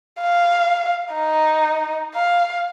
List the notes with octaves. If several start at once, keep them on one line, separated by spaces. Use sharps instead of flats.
F5
D#4
F5